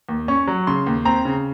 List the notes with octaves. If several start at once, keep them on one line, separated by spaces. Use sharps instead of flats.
D#2
C#4 C#6
F#3
C#3 C6
D#2
C4 A#5
C#3